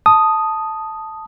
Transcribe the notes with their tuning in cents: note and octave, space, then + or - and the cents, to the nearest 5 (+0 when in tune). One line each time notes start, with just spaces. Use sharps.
A5 +0 D#6 +0